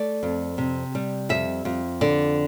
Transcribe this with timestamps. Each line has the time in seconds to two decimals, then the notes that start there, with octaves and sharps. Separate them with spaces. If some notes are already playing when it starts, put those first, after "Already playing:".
Already playing: A3 D5
0.23 F2
0.58 C3
0.95 G3
1.29 F2 E5
1.65 F2
2.01 D3 D5